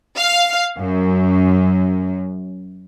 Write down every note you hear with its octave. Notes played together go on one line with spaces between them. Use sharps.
F5
F#2